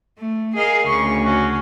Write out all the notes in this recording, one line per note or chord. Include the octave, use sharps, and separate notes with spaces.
A3
G#4 A#4 D#5 F5
D2 C#3 C#6
C#4 F#4